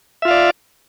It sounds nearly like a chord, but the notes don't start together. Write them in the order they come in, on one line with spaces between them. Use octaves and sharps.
E5 F4 F5 D5